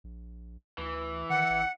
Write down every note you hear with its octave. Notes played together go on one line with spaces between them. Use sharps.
A#1
D2 E3
D#3 F#5 C#7
A1